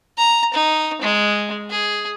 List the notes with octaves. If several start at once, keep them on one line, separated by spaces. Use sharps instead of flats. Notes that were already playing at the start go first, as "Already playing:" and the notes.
A#5
D#4
G#3
G#4